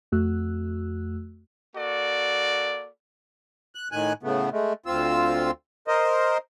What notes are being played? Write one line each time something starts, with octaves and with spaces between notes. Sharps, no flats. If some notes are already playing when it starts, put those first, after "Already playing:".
F2 A3 F#4 E6 F#6
A#3 F#4 A4 D5
F#6
A2 D#3 G#5 F#6
A2 C#3 A3 B3
G#3 A3
D2 C4 F4 E6
A#4 C5 D#5